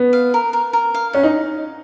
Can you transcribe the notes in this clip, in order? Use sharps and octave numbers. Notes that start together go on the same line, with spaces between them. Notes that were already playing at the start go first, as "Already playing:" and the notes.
Already playing: B3
F5
A#4
A#4
A#4
F5
C#4 F#5
D#4